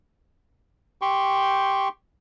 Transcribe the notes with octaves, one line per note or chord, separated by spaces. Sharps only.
G4 G5 C6 C#6